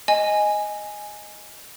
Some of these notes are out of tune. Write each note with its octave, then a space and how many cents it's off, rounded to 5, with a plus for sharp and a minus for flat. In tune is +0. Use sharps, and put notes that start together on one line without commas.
D#5 +0 G#5 +0